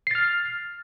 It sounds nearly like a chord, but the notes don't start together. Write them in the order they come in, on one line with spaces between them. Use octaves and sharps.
C7 A6 F6